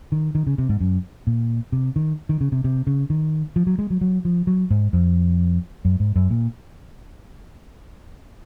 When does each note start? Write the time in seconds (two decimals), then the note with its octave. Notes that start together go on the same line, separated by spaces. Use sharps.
0.12 D#3
0.35 D#3
0.47 C#3
0.58 C3
0.69 G#2
0.80 F#2
1.27 A#2
1.72 C3
1.96 D#3
2.29 D#3
2.41 C#3
2.52 C3
2.64 C3
2.87 C#3
3.10 D#3
3.56 F3
3.67 F#3
3.79 G#3
3.90 F#3
4.01 F#3
4.25 F3
4.47 F#3
4.70 G#2
4.93 F2
5.85 F#2
6.00 G#2
6.16 F#2
6.30 A#2